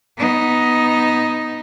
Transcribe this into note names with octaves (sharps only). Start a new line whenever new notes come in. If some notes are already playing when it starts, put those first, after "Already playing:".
B3 D#4